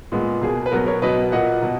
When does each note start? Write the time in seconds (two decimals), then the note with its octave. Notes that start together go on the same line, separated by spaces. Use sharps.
0.12 A#2 G#3 B3
0.41 B2 A#3 G#4
0.66 B4
0.71 B2 F#3 B3 F#4 A#4
0.86 A#4 C#5
1.02 B2 F#3 B3 B4 D#5
1.32 A#2 A#3 D#5 F#5
1.62 B2